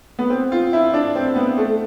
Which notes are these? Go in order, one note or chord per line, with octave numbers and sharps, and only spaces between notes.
B3
C4
F4
E4
D4
C4
B3
A3